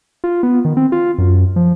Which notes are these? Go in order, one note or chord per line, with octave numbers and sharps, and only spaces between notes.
F4
B3
D#3
C4
F4
F#2
F3